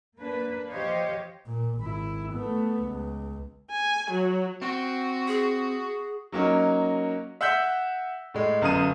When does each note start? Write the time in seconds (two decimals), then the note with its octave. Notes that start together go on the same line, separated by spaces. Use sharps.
0.18 A#3 D4 B4
0.70 F3 G4 C5 C#5 D#5 F5
1.47 A#2
1.79 G#1 E4
2.34 A3 B3
2.84 C#2
3.69 G#5
4.10 F#3
4.62 C4 F#4
5.27 G#4
6.32 F#3 A#3 C#4 D#4
7.41 E5 F#5 E6 F#6 G6 B6
8.34 A2 G#3
8.61 G1 F#2 F5 D#6 D#7